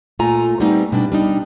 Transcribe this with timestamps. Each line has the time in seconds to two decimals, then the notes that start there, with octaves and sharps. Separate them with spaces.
0.19 A#2 A3 F4 G#5 A#5
0.60 G3 A3 B3 C4 D#4
0.92 B2 G3 D4
1.12 G3 D4 D#4